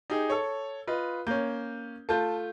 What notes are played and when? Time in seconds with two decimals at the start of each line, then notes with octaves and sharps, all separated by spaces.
0.10 D#4 G4 G#4
0.30 A4 C#5
0.87 F4 B4 D#5
1.27 A#3 C#4 G6
2.09 A3 F4 A5 G6